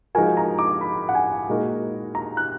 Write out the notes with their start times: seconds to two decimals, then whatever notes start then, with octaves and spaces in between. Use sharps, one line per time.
0.15 F3 G#3 D#4 F#4 A#4 G#5
0.37 A#5
0.59 D6
0.81 B5
1.09 F#5
1.15 G#5
1.49 A#2 G#3 D#4 F#4 A#4
2.15 A#5
2.37 F#6